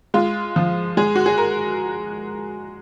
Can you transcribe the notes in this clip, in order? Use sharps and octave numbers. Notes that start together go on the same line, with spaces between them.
G#3 F4
F3
G#3 G#4
F#4
G#4
A#4